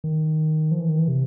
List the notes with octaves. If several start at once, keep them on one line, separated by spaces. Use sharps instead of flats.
D#3
F3
E3
D#3
E3
C3